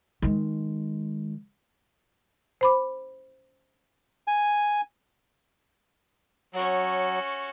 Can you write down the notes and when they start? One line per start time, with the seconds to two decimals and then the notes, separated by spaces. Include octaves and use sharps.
0.22 D#3 G#3
2.61 C5 B5 D6
4.28 G#5
6.54 F#3 C#4 F#4